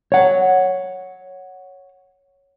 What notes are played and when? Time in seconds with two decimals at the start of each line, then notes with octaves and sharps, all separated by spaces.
0.12 C#5 F#5